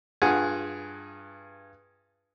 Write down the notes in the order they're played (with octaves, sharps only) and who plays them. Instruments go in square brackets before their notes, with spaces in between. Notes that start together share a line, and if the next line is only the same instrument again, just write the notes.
[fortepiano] G2 F4 G#4 F#5 G#5